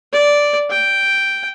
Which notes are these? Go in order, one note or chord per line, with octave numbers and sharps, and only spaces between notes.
D5
G5